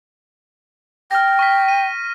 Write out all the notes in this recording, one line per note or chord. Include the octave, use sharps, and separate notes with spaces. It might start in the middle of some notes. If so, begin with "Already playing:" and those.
G5 F6 A#6
C#6 F6 B6
D#7